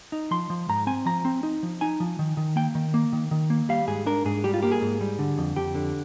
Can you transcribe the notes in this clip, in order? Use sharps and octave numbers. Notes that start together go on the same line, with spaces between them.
D#4
F3 C6
F3
G#2 A#5
C4 G#5
F3 A#5
C4
D#4
F3
D#4 G#5
F3
D#3
D#3
A#3 G5
D#3
A#3
D#3
D#3
A#3
G3 F5
G#2 G#4
D4 A#4
G#2 G#4
G3 G4
F4
A#3 G4
G#4
G#2
G3
D3
F2
F2 G4
D3